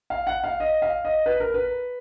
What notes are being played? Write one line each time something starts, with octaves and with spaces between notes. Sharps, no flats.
F5
F#5
F5
D#5
F5
D#5
B4
A#4
B4